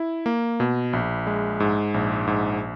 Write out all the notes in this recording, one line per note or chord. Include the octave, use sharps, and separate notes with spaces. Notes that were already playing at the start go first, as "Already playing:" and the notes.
Already playing: E4
A#3
B2
A#1
G#3
G#2
A#1
G#2